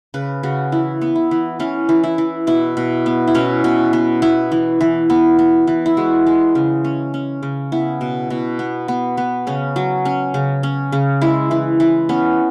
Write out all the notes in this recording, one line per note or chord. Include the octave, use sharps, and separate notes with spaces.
C#3 B4
C#3 F#4
E3 E4
B3
E4
E3
E3 C#4
E3
E4
E3
B2 E4
B2
B3
E4
B2 C#4
B2
B3
B3 E4
E3
E3
B3
B3
E3
E4
G#3 F#4
G#3
C#3
C#4
C#4
C#3
B3 E4
B2
B2
B3
B3
B3
C#3 C#4
F#3
C#4
C#3
C#4
C#3
G#3 E4
E3
E3
B3 C#4